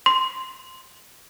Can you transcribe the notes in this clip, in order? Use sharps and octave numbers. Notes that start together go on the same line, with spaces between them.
C6